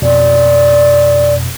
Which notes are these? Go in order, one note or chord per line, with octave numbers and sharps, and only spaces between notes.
F2 B2 D5